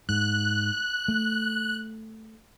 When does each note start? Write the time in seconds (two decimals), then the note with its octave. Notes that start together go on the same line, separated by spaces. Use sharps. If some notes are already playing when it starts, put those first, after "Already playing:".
0.09 G#2 F#6
1.08 A3